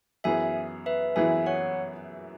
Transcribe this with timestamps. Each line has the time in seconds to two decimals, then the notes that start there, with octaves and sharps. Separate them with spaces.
0.24 F#2 E3 B3 E4 G#4 E5 G#5
0.86 B4 E5
1.16 F#2 E3 B3 E4 G#4 E5 G#5
1.46 C#5 F#5